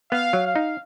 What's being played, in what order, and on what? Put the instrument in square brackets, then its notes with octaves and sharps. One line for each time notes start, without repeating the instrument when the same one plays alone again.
[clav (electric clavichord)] B3 [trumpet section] F5
[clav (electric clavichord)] F#3
[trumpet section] F5
[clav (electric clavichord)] D#4